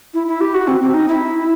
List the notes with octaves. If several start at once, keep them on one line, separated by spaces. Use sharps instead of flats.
E4
E4
G4
F#4
C4
C4
D#4
E4